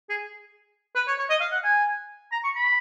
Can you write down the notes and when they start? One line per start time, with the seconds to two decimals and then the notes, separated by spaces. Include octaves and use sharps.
0.10 G#4
0.96 B4
1.08 C#5
1.18 C#5
1.30 D#5
1.41 F5
1.52 F#5
1.64 G#5
2.32 A#5
2.44 C#6
2.55 B5